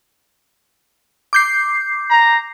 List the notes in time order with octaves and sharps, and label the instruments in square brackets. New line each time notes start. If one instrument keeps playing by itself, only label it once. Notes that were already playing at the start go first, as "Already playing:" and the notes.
[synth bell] D6 G6 C7
[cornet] A#5